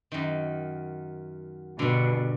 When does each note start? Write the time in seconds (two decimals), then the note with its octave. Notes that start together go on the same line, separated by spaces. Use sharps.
0.12 F#2 D#3
1.79 G2 B2 D3